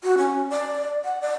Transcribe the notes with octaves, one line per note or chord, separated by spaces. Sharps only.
F#4
C#4
D5
F#5
D5